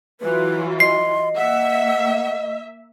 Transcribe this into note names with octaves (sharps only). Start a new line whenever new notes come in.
E3 F#3 F4 B4
D#5 C6 C7
A#3 E5 F#5